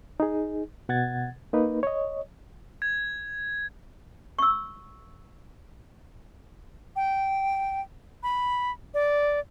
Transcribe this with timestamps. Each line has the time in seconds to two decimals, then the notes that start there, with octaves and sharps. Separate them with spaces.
0.20 D#4 G#4
0.89 B2 F#5 G#6 A6
1.53 A#3 D#4 B4
1.83 C#5 D#5
2.82 G#6
4.39 C#6 E6
6.96 G5
8.23 B5
8.94 D5